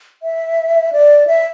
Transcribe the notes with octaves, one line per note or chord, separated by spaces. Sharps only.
E5
D5
E5